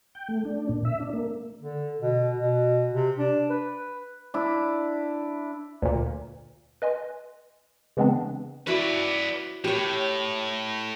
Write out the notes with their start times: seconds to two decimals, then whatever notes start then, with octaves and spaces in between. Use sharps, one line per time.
0.15 G5
0.28 A3
0.45 D4
0.69 A#2
0.85 E5
1.00 D4
1.13 A#3
1.61 D3
2.02 B2
2.35 B2
2.94 C3
3.18 D4
3.50 B4
4.34 D4 E4
5.82 D2 A#2
6.82 B4 D#5 G#5 C6
7.97 C#3 E3 G#3 B3 C4 D4
8.67 E4 F#4 B4 D5 A5
9.64 A2 G4 C#5